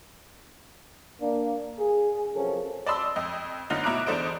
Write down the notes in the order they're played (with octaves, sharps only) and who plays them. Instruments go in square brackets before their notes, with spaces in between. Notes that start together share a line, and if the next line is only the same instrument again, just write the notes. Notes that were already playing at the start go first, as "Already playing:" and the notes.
[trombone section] A#3 D4
G#4
C3 F3 F#3 C#4 A4 A#4
[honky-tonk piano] D5 D#5 A5 B5 C6 E6
F2 D#5
F#2 D3 B3 D#4 F4
B2 E4 A#5 D6 F#6 D7
E2 D4 A4 C5 D#5 D7